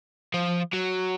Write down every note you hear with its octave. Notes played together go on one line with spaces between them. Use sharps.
F3
F#3